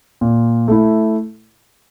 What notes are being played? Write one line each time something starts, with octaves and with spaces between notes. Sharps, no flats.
A#2
A3 E4